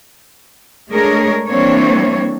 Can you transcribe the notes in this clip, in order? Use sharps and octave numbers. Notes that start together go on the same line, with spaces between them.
G#3 A3 D4 G#4 A#4 C#5
E3 G3 A#3 C4 D4 C#5